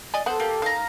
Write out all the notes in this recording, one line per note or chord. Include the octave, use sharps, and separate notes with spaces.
D5 D#5 G#5
B3 A4 C5 F#5
A#3 G4
D#3 F5 A#5